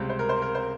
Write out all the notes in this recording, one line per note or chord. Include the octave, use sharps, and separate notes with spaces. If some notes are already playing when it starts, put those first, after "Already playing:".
Already playing: C#2 C3 G3 C4
C5
A#4
C5
A#4
C5